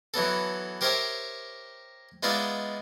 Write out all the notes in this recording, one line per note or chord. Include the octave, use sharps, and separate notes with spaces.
E3 F#3 B3 A4
G4 A#4 C5 C#5 E5 G5
G#3 B3 D#4 F4 D5 E5